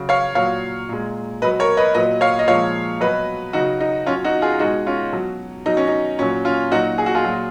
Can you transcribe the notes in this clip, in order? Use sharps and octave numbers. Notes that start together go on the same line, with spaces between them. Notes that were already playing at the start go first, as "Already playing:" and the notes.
Already playing: C#3 F#3
C#5 F5
A#2 F#3 C#5 F5
A#2 G#3
B2 F#3 B4 D#5
A#4 C#5
B4 D#5
A#2 F#3 B4 D#5
C#5 F5
D#5
A#2 F3 G#3 C#5 F5
B2 F#3 B4 D#5
C#3 F#3 D#4 F#4
D#4
B2 F#3 C#4 F4
D#4 F#4
F4 G#4
B2 G#3 D#4 F#4
C#4 F4
B2 F#3
B2 F#3 D#4
C#4
D#4
A#2 F#3 C#4
C#4 F4
A#2 F#3 D#4 F#4
G#4
F#4
F4 G#4
A#2 F#3